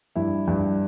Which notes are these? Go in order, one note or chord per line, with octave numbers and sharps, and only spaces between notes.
G2 E4
G2